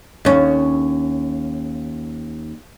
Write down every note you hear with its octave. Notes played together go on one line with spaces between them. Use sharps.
D#2 C#4